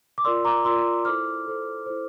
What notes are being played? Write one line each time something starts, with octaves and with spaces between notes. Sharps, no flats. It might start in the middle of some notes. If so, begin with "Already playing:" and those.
D6
F4 A#4 D5 C6 E6
A#5 D6
F4 A#4 D5 C6 E6
E4 A4 C5 D6 F6
E4 A4 C5
E4 A4 C5